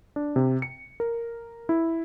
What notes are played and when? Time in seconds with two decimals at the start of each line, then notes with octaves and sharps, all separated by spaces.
0.16 D4
0.36 C3
0.62 C#7
1.00 A#4
1.69 E4